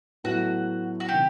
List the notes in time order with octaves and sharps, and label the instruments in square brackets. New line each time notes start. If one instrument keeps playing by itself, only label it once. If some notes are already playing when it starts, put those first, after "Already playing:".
[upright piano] A2 F#3 B3 [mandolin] F#4
[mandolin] F#4
[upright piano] C3 D#3 [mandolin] G4